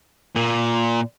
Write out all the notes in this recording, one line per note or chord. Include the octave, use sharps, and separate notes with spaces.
A#2